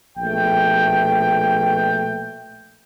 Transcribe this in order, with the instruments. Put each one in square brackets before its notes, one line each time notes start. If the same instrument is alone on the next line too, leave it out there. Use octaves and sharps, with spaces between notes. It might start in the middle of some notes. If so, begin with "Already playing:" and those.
[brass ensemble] A#1 B2 A3 G5